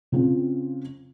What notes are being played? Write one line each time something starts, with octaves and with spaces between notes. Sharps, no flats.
C#3 C4 F4